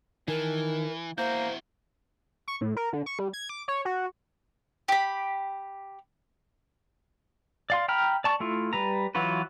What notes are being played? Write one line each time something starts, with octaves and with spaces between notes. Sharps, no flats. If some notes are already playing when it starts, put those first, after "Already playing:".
D#3 E3 A#4 G#5 A5
A#3 E4 F#4 C5 G6
C#6
A2
A#4
D3
C#6
G3
G#6
D6
C#5
F#4
G4 B5
D5 F5 C6
G5 A#5 B5 F6
D5 A5 C#6
A3 E4 F4
G3 B4 A#5
E3 F#3 F4 F#4 B4